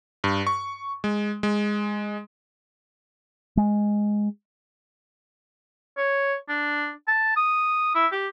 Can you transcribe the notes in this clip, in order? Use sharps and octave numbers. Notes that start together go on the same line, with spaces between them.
G2
C#6
G#3
G#3
G#3
C#5
D4
A5
D#6
E4
G4